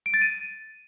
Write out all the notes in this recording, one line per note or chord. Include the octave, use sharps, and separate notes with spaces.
D7
A6
D#7